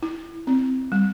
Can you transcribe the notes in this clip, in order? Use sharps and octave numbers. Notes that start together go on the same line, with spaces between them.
E4
C4
G3